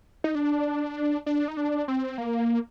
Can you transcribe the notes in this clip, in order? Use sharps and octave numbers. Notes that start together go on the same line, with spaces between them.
D#4
D4
D4
D#4
D4
C4
A#3